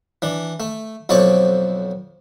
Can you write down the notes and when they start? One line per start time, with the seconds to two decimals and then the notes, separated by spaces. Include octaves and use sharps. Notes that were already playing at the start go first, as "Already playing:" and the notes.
0.22 E3 D4
0.60 A3
1.09 B1 F2 C4 C#5 D5 D6